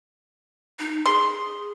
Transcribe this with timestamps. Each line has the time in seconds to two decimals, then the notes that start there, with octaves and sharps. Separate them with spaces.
0.79 D#4
1.06 G#4 C6